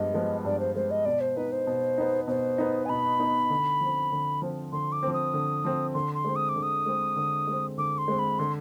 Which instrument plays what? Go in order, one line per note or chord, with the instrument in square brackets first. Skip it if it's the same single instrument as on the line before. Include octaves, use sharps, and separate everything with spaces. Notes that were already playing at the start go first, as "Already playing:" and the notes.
Already playing: [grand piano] G2 F3 G#3 B3 [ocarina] D#5
[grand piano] F3 G#3 B3
[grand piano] G2 [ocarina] D5
[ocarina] C5
[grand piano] F3 G#3 B3 [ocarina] C5
[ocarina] D#5
[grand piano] B2 [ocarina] D5
[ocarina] C5
[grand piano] B3 D#4 [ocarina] B4
[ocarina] C5
[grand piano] B2
B3 D#4
[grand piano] B2 [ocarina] C5
[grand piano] B3 D#4
[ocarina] G#5
[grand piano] B2 [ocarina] B5
[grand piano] B3 D#4
D3
F3 C4
D3
F3 C4
[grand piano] D3 [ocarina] C6
[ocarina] D6
[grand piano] F3 C4
[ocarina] D#6
[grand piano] D3
F3 C4
[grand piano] D3 [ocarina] C6
[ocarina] C6
[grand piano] G#3 C4
[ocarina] D#6
D6
[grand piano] D3
[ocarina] D#6
[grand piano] G#3 C4
D3
G#3 C4
[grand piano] D3 [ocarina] D6
[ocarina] C6
[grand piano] G#3 C4
[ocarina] B5
[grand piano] D3 [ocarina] C6